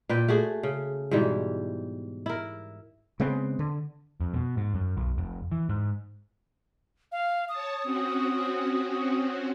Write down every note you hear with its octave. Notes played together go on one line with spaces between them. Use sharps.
A#2 B4 G5
A3 F#4 G#4
C#3
G#2 B2 E3 G3
E4 A#4
C#3 G#3 B3 C4
D3
F2
B2
G#2
F#2
B1
F1
E3
G#2
F5
C#5 A5 D#6
C4 C#4 F#4